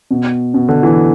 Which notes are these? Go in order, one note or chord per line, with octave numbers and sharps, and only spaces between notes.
B2
B2
D3
E3